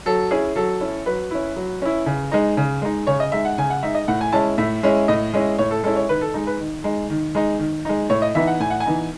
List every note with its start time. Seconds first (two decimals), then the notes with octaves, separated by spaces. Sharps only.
0.06 F#3 A4
0.31 C#4 E4 G#4
0.56 F#3 A4
0.81 C#4 E4
1.06 F#3 B4
1.31 C#4 E4
1.56 F#3
1.82 C#4 E4
2.06 C#3
2.32 G#3 D#4
2.57 C#3
2.82 G#3 D#4
3.07 C#3 C#5
3.20 D#5
3.32 G#3 D#4 E5
3.45 F#5
3.58 C#3 G#5
3.70 F#5
3.83 G#3 D#4 E5
3.95 D#5
4.08 A2 F#5
4.21 G#5
4.32 G#3 C#4 E4 A5
4.58 A2 E5
4.83 G#3 C#4 E4
5.08 A2 D#5
5.33 G#3 C#4 E4
5.58 A2 C#5
5.71 A4
5.83 G#3 C#4 E4 A4
5.96 C#5
6.09 D#3 B4
6.21 A4
6.34 G#3 D#4
6.47 B4
6.60 D#3
6.84 G#3 D#4
7.10 D#3
7.35 G#3 D#4
7.59 D#3
7.85 G#3 D#4
8.10 A2 C#5
8.22 D#5
8.35 E3 B3 D#4 E5
8.47 F#5
8.60 A2 G#5
8.70 F#5
8.80 G#5
8.86 E3 B3 D#4